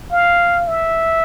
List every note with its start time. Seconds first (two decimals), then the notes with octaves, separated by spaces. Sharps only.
0.12 F5
0.68 E5